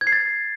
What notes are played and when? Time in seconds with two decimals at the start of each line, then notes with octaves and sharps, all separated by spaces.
0.01 G#6
0.07 C7
0.12 A6